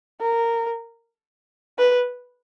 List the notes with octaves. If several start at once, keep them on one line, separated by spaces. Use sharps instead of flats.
A#4
B4